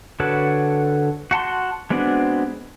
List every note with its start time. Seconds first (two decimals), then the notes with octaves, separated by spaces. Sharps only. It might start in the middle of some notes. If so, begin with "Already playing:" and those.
0.20 D3 F#4 A4 B4 C#5
1.31 F#4 F#5 A5 C6
1.90 G#3 B3 C4 D4 F#4